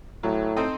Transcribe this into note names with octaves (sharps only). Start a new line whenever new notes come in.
A2 F#3
C4 D#4 A4 C5